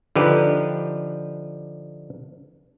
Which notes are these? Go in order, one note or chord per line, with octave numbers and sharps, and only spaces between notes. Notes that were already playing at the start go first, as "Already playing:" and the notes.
D3 F3 D#4 G4 B4